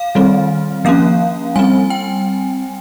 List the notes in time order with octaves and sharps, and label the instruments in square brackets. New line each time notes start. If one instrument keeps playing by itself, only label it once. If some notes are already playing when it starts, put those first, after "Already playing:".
Already playing: [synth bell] F5
D#3 G3 C4
F3 A#3 C#4 F5
G3 C4 G#5
G5